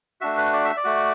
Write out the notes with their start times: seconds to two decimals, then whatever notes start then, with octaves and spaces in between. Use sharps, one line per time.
0.21 A3 D4 F#4 E5
0.37 B4
0.53 D5
0.65 E5
0.77 D5
0.84 A3 F#4